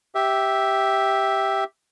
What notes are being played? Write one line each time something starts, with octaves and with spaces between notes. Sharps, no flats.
G4 E5